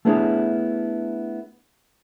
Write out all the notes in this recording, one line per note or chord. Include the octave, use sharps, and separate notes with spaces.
A3 B3 D4 E4 G#4 C#5